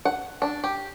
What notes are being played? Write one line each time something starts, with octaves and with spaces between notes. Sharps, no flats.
F#5
D4
G4